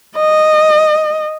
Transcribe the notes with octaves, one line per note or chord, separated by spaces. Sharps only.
D#5